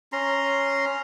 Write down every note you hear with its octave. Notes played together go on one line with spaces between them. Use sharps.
C#4 A#5 C6